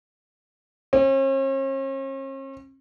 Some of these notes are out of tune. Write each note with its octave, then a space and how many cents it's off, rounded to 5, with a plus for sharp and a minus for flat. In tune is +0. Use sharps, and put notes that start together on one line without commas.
C#4 -45